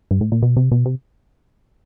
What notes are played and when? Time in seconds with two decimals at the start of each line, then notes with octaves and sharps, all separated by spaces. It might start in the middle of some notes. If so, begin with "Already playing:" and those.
0.11 G2
0.21 A2
0.32 A#2
0.42 B2
0.57 C3
0.71 B2
0.85 C3